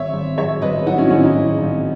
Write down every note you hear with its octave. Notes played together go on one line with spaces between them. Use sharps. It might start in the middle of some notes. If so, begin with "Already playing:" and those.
Already playing: G#1 C#5 E5
G#1
F#3 C#5 E5
G#1 B4 D#5
F#3 D#4 F#4
C#4 E4
G#1 C#4 E4
D#4
G#1
G#1